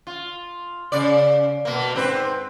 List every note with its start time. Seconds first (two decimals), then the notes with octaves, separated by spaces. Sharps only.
0.07 F4
0.92 C#3 D5
1.65 B2 A#3
1.95 G#2 C4 B4